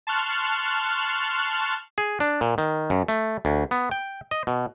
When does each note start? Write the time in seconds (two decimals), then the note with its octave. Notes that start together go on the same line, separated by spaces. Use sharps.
0.07 A5 C6 C#6 F6 F#6
1.98 G#4
2.20 D4
2.41 A#2
2.58 D#3
2.90 F#2
3.08 A3
3.45 D2
3.71 B3
3.91 G5
4.31 D#5
4.47 B2